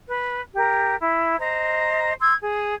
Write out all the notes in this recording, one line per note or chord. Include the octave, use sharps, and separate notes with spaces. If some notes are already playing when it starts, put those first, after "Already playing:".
B4
G4 A#4
E4
C5 D#5 A#5
C6 E6 G#6
G#4